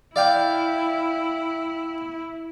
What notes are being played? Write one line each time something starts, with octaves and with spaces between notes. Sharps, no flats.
E4 D5 F5 G5